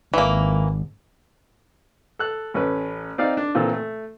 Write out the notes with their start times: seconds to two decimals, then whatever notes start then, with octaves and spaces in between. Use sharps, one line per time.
0.13 G#1 E3 A#3
2.19 A4 F#6
2.54 A1 C#4 B4
3.18 C4 D#4 D5 F5
3.37 D4
3.55 A#2 E3 C4 F4 A4
3.73 A3